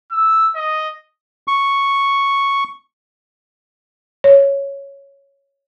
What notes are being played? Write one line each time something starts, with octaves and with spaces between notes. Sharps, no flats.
E6
D#5
C#6
C#5